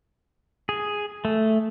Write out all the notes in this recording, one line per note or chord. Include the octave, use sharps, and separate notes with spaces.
G#4
A3